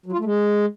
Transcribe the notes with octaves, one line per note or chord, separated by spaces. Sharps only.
F#3
F4
A3
G#3